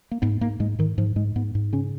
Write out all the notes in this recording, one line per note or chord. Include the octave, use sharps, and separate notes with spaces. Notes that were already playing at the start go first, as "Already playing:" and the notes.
A#3
G#2 B3
G#2 A#3
G#2 G#3
G#2 D#3
G#2 F3
G#2 G#3
G#2 B3
G#2
C#3 C#4